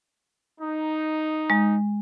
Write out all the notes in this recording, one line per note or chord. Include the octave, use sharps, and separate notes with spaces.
D#4
G#3